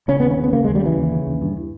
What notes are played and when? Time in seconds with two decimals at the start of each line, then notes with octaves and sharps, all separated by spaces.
0.08 C#3 C#4
0.20 B3
0.23 D#2
0.30 C#4
0.38 C#3
0.44 B3
0.53 C#3 A#3
0.64 G#3
0.68 D#2
0.75 G3
0.82 C#3 E3
0.97 D#2
1.12 C#3
1.27 D#2
1.42 G2